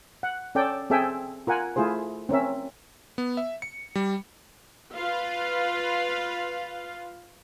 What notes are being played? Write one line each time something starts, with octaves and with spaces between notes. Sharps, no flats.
F#5
C#4 A4 D5 G5
C4 G#4 A4 E5 G5 G#5
F4 A#4 F#5 G#5
A3 E4 F4 G#4 C5
C4 C#4 A#4 E5
B3
E5
C#7
G3
F4 B4 F5